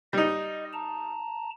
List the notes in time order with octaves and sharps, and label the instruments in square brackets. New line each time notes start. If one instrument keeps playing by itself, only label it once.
[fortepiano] G3 D#4 [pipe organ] D#5
[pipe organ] A5 A#5